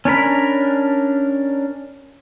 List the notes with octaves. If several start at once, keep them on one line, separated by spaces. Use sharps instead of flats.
C#4 D4 A#4 B5